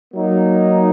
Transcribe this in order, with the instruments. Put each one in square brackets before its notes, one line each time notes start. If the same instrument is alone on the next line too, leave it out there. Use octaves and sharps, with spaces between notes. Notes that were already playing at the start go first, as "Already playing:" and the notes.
[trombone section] F#3 A#3 D#4